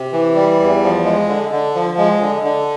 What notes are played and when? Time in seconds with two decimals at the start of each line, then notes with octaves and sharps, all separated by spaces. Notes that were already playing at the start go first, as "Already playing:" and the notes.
Already playing: C3
0.12 E3
0.35 G3
0.60 E2
0.83 F3
1.05 G#3
1.29 D3
1.52 D3
1.75 F3
1.98 G#3
2.21 D3
2.44 D3